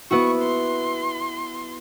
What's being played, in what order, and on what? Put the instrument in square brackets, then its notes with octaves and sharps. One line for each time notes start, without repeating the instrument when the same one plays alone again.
[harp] B3 E4 F#4 [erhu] C#6
[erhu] C6